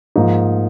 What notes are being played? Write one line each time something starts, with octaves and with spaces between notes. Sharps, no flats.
G#2 F3 A#3 D#4